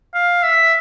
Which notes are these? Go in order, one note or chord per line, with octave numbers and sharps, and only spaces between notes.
F5
E5